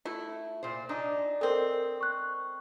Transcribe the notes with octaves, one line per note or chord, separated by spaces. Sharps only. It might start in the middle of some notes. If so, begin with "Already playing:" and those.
A3 E4 F4
A#2 C5
D4 D#4 G#5
G#3 C4 A4 A#4
C#6 F#6